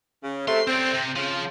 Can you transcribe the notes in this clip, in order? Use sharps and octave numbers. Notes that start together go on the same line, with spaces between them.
C#3
C3 A3 C6
C4 C5 D5
C3
C#3 F3